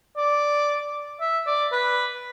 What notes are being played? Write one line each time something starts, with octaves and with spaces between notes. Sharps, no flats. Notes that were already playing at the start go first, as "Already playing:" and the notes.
D5
E5
D5
B4